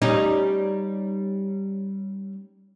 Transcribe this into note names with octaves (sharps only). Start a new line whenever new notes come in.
G3 C#4 D#4